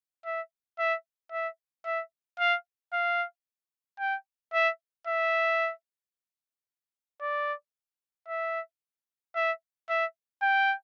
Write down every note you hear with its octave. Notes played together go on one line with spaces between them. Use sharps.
E5
E5
E5
E5
F5
F5
G5
E5
E5
D5
E5
E5
E5
G5